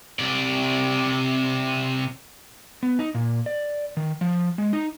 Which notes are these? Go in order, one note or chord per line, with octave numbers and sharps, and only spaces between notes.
C3 D5
B3
D#4
A#2
D5
D#3
F3
G#3
D#4